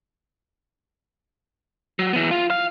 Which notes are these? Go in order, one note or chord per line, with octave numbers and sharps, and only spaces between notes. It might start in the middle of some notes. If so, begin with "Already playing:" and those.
F#3
E3 B3
F4
F5